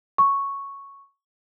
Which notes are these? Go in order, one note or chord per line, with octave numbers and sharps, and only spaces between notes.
C#6